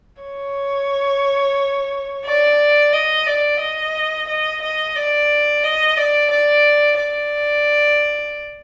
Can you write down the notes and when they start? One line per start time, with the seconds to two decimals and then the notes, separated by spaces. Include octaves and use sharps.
0.23 C#5
2.25 D5
2.93 D#5
3.26 D5
3.60 D#5
4.28 D#5
4.62 D#5
4.96 D5
5.64 D#5
5.97 D5
6.31 D5
6.99 D5